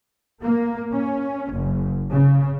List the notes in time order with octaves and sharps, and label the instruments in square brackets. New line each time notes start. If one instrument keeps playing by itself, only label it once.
[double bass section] A#3
C#4
F#1
C#3